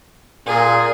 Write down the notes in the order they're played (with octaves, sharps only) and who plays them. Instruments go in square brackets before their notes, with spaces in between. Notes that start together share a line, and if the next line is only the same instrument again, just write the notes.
[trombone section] A#2 [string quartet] G#4